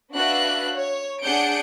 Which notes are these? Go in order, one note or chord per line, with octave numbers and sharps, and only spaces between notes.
D4 F#4 B4 E5 F5 F#6
C#5
D4 G#4 F#5 G6 C#7 D7